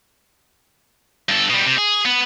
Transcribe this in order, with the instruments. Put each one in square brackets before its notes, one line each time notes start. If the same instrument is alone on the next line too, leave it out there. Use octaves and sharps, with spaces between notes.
[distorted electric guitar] G2 A4
B2 G3
C3
G#4
B3